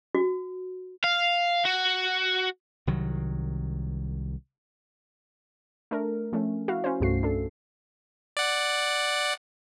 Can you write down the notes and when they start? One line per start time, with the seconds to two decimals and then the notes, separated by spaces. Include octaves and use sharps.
0.15 F#4
1.04 F5
1.65 F#4
2.87 C2 D#3 F#3
5.91 A3 D4 A#4
6.33 F3 A3 C#4
6.68 E4 F#4 F5
6.84 C#4 C5
7.00 C2 G2 A3 F#4 C7
7.23 D4 A4
8.37 D5 F#5